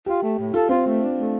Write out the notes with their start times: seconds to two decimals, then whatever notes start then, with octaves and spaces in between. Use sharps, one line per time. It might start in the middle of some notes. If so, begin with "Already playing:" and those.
0.06 F4 G4
0.22 A3
0.38 A2
0.53 F4 A4
0.68 C4 F4
0.85 A3
1.01 D4
1.17 A3